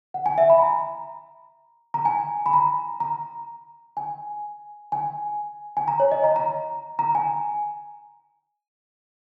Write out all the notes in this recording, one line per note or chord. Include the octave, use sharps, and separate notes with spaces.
F#5
G#5
E5
B5
A#5
A#5
G#5
B5
A#5
A#5
G#5
G#5
G#5
A#5
C#5
D#5
A#5
A#5
A#5
G#5